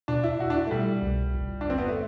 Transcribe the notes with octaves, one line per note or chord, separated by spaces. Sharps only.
B2 D4
E4
B2 F#4
D4
E4
A3
B2 G3
C2
G1
D4
G1 C4
B3
A3